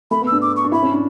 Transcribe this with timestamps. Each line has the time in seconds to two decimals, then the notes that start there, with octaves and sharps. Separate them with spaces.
0.11 A3 B5
0.21 B3
0.27 D4 E6
0.42 D6
0.56 C#6
0.64 D4
0.72 E4 B5
0.83 C#4
0.92 D4